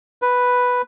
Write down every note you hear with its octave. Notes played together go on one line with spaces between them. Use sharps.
B4